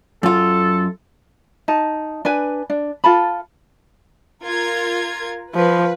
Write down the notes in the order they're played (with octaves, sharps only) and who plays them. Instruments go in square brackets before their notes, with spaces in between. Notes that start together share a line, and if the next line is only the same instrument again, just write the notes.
[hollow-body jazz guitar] F#2 F4 [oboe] A4
[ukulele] D#4 A5
D4 B4 G#5
D4
F4 A4 A5 B5
[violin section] F4 A#4 G#6
[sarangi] F3 [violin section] B4